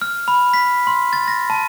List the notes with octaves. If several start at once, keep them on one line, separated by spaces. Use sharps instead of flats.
F6
B5
B6
C6
A6
A#6
A5